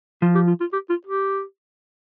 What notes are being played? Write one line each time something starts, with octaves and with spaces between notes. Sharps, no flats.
F3 F4
G4
F4
F4
G4
F4
G4